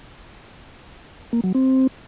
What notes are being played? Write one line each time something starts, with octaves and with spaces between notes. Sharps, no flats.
A#3
F#3
C4